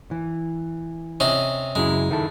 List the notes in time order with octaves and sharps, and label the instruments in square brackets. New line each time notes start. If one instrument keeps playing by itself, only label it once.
[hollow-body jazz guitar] E3
[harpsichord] C3 C#4 D#4
[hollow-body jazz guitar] F#2 C#3 E4 [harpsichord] G#3
[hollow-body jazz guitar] D#3 E4 A4